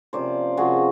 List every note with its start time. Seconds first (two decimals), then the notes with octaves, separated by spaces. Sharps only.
0.13 C3 F3 A#3 C#4 C5 D5
0.57 C3 F3 A#3 C#4 F#4 G#4